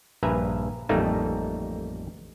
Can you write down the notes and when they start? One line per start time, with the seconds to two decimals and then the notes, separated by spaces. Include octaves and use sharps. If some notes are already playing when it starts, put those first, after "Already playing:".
0.23 A#1 G2 B4 E5 G#5 A#5
0.89 A1 F2 G3 A3 A#3 D#4